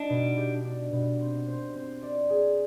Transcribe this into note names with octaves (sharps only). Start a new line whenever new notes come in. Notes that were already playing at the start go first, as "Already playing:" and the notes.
Already playing: D4 D#4
B2
G4
D4
B2
C4
C5
C4
D5
G#4